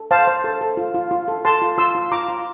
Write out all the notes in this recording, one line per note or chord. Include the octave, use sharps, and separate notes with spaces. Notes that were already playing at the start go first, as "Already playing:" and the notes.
Already playing: A4
C5 F5 A5
C5
A4
A4
F4
F4
F4
A4
A4 A5 C6
F4
F4 C6 E6
F4
F4 A#5 D6
F4